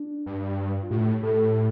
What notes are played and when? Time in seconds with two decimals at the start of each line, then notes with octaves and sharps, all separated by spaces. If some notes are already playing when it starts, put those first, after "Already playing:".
Already playing: D4
0.26 G2
0.83 F4
0.91 A2 G4
1.22 A2 A4